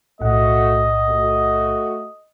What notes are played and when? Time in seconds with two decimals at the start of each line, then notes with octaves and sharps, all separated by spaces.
0.21 B1 A2 A3 F#4 D#5 F#5
1.09 A3 F#4